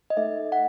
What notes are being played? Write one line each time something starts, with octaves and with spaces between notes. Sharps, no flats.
D#5
A3 D#4 A4 E5
F#5